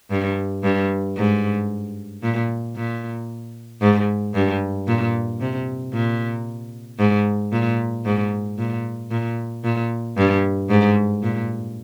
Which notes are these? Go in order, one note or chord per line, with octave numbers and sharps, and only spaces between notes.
G2
G2
G#2
A#2
A#2
G#2
G2
A#2
C3
A#2
G#2
A#2
G#2
A#2
A#2
A#2
G2
G#2
A#2